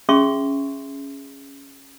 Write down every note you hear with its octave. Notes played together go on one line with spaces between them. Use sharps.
C#4 G#4 E5 C6 C#6